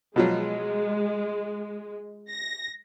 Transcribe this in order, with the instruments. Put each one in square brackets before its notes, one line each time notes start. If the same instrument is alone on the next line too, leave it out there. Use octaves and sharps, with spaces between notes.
[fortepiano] B2 F3 F#3 [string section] G#3
[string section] A#6